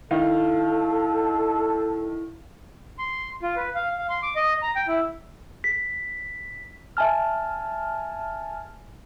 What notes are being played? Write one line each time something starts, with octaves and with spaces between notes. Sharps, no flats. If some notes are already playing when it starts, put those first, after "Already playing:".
D#3 E4 A4 F5
C6
F4
B4
F5
F5
C6
D6
D#5
A#5
G5
E4
B6
E5 G#5 A5 F6